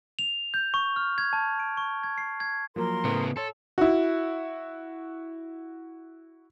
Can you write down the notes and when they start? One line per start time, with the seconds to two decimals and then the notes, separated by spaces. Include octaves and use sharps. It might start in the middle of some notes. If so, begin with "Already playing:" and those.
0.19 F7
0.54 G6
0.74 C#6
0.96 F6
1.18 G#6
1.33 A5
1.60 D7
1.77 C#6
2.04 G#6
2.18 C7
2.40 G#6
2.76 F3 F#3 A#3 A#4 C6
3.05 A2 C#3 B3
3.37 A4 C#5 C6
3.78 E4 F#4